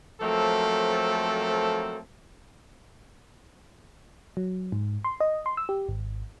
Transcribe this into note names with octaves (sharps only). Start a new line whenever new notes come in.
F3 F#3 A3 A#3 C4 A4
F#3
G#2
C6
D#5
C6
E6
G4
G#1